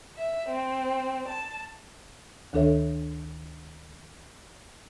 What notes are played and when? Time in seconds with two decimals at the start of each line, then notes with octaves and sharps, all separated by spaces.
0.17 E5
0.49 C4
1.28 A5
2.53 D2 D#3 D4 A4 C#5 E5